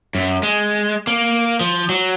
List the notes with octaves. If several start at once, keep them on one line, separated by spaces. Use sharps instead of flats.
F#2
G#3
A#3
F3
F#3